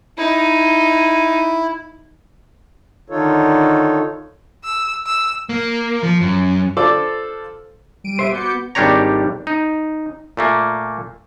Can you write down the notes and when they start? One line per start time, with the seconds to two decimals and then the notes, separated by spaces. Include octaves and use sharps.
0.18 D#4 E4
3.10 D3 D#3 D#4 F4 A4 C#5
4.64 E6
5.06 E6
5.49 A#3
6.03 F3
6.21 F#2
6.77 F4 A4 C5 D5
8.04 G3 D7 D#7
8.19 C5 E5
8.32 B3 F#4 D6 G6 C#7
8.75 G#1 G3 D4 G4 C#5 A#5
9.47 D#4
10.37 A#2 A3 A#3